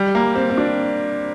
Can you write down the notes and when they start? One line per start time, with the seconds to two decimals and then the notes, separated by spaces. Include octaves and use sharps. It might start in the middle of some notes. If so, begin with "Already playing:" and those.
Already playing: G3
0.15 A#3
0.35 C4
0.50 C4
0.57 D4